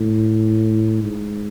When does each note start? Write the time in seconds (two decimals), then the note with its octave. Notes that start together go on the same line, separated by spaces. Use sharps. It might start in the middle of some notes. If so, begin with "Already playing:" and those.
Already playing: A2
1.03 G#2